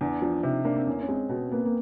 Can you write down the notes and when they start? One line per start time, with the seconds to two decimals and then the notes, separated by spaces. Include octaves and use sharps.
0.01 E2 D4
0.22 F3 D4
0.43 C3 D#4
0.65 A#3 D4
0.76 C4
0.87 E2 C#4
1.00 C#4
1.08 G#3 C4
1.29 B2 C4
1.51 A#3 B3
1.65 A#3